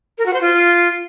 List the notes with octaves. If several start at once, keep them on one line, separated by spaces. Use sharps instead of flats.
A#4
F#4
C5
F4